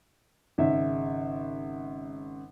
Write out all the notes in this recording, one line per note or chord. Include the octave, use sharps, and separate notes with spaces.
G#1 C#3 E5